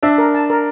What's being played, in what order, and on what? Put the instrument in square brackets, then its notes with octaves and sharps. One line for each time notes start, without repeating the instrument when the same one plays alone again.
[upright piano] D4 [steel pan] E5
[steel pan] A#4
A5
A#4